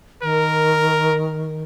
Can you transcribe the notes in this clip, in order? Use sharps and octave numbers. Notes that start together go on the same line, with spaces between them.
D#3 A#4